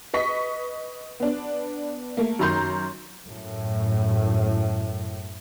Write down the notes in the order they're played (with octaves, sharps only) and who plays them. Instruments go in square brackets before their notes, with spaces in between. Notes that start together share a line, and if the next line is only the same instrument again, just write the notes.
[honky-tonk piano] B4 D#5 C#6 B6
B3 D4
A3 A#3
F#2 D#3 A#5 C6 G6
[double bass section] F#2 A2